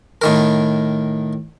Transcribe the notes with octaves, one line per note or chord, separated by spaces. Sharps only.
A2 D#3 A#4